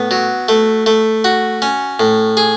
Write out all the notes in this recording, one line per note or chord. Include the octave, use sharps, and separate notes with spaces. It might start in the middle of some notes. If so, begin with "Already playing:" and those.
Already playing: A2 B3
F#3
A3
A3
F#4
C#4
A2
G#4